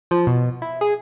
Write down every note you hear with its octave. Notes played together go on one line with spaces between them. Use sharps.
F3
B2
E4
G#4